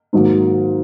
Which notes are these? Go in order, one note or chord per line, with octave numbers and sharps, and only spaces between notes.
G#2 D#3 F#3 A#3